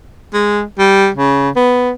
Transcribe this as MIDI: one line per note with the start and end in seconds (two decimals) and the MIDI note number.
0.34 0.62 56
0.79 1.09 55
1.14 1.50 49
1.56 1.92 59